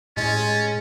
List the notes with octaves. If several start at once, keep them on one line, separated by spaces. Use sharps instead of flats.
A2 G#3 C#4 A6